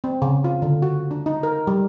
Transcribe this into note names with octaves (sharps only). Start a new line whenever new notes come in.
C4
C#3
F4
D3
F#4
D4
D#4
A#4
G3